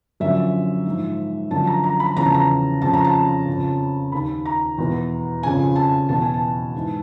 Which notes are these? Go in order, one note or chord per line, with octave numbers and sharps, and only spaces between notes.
F#2 D3 F3 E5
G#2 F3
F#2 D3 F3 A5
A#5
A#5
B5
E2 C#3 F3 A#5
A5
A#5
F2 C#3 F3 A5
A#5
A5
F2 C#3 F3
D#2 D#3 B5
A#5
E2 B2
F2 C#3 F3 G#5
A5
E2 B2 A5
G#5
A5
G#2 E3